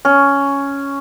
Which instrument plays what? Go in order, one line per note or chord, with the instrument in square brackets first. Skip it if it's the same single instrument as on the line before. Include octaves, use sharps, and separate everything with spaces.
[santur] C#4